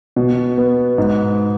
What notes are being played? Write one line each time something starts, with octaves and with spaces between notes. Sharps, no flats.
B2
B3
G#2